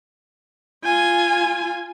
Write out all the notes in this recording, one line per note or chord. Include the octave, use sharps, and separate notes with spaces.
F4 G#5